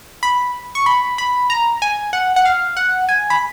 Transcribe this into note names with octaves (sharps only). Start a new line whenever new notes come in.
B5
C#6
B5
B5
A#5
G#5
F#5
F#5
F5
F#5
G#5
B5